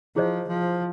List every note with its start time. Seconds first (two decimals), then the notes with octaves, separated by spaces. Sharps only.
0.15 F3 E4 G#4 C5 D#5
0.48 F3